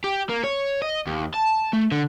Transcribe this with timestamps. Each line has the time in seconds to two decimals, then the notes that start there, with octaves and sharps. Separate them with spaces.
0.04 G4
0.30 A#3
0.44 C#5
0.82 D#5
1.07 D#2
1.34 A5
1.73 A3
1.92 D3